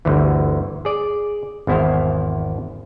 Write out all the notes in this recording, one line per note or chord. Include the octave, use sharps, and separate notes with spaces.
G1 D2 E3
G#4 D5
G#1 E2 E4 C5 F5